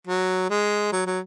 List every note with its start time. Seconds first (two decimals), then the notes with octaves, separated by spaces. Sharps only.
0.07 F#3
0.50 G#3
0.92 F#3
1.06 F#3